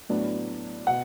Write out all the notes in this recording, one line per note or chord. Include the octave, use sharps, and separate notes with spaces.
A2 F#3 B3 D4
B2 F#5